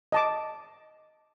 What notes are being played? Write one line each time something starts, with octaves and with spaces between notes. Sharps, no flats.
D#5 A5 D6